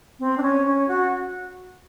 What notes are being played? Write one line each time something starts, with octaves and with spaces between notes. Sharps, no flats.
C4
D4
C#4
C#4
F#4